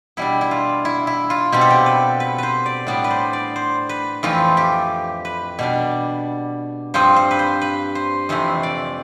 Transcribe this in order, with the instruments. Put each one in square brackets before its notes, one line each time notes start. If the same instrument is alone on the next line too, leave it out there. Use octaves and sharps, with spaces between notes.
[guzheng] B2 G3 D4 E4
E4
F4
E4
E4
F4
B2 G3 C4 G4
A4
G4
B4
B4
B4 C5
D5
A2 G3 B3 D4 D5
B4
C5
D5
C5
B4
F2 E3 A3 C4 F4
G4
B4
B2 G3 D4
G2 F3 C4 C5
C5
B4
C5
B4
C5
F2 C3 E3 A3 C5
D5